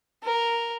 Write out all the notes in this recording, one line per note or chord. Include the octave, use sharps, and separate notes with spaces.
A#4